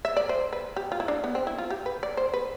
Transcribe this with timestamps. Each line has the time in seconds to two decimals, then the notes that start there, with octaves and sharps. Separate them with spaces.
0.05 E5
0.17 D5
0.29 C5
0.53 B4
0.76 G4
0.92 F4
1.00 E4
1.08 D4
1.24 B3
1.35 C4
1.47 E4
1.58 F4
1.70 G4
1.86 B4
2.03 D5
2.17 C5
2.34 B4